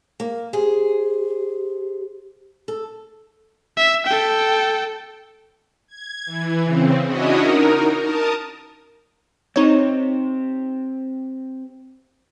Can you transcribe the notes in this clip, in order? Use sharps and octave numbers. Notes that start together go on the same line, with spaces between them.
A#3
G4 G#4 C5
A4
E5
A4 G5
G#6
E3
C#3 C4
C#4 D4 E4 F#4 C#5 D#5
D#4 A#4
A#4 A5 D#6
C4 D#4 G4 C#5